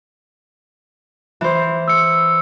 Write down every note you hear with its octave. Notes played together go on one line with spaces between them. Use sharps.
E3 C5
E6 C#7